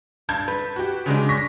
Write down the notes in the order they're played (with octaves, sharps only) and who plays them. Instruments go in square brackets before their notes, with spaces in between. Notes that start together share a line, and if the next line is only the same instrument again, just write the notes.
[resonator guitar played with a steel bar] G2 [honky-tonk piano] A5 G6 G#6
[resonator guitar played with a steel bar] B4
[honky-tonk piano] F#4 G4
[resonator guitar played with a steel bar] C#3 G#3 D4
[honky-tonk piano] C#6 A#6 B6